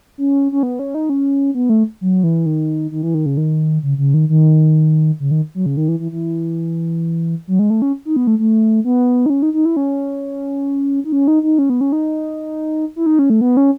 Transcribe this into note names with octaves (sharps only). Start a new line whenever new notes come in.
C#4
C#4
B3
C#4
D#4
C#4
B3
A3
F#3
E3
D#3
D#3
E3
D#3
C#3
D#3
C#3
C#3
D#3
D#3
C#3
D#3
F#3
C#3
D#3
E3
E3
E3
F#3
G#3
A3
C#4
D#4
B3
A3
A3
B3
D#4
C#4
D#4
D#4
E4
C#4
D#4
C#4
D#4
D#4
C#4
B3
C#4
D#4
E4
D#4
C#4
A3
B3
C#4